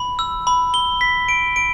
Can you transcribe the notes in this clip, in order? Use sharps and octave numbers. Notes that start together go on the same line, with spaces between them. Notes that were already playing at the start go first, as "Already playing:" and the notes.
Already playing: B5
E6
B5
G7
B6
D7
D7